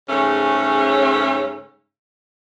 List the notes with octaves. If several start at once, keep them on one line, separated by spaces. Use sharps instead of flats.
G#2 C#3 G3 A3 C#4